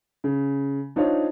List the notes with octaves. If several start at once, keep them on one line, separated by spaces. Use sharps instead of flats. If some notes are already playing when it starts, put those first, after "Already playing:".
C#3
D4 D#4 F4 C5 C#5